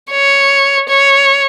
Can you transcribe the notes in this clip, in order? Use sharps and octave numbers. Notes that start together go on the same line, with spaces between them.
C#5
C#5